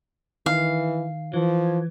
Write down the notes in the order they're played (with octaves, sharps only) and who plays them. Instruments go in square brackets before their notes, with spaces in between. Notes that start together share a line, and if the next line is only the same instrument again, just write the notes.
[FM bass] D#3 [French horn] E3 [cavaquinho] F5
[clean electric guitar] E3 [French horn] F3